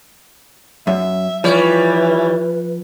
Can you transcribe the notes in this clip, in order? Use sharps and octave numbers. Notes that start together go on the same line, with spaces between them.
F#2 E5
E3 F3 G3 B4 C#5